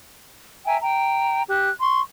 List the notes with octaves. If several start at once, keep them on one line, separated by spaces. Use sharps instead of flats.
E5 G5 G#5 A#5
G5 A#5
G4 F#6
C6 C#6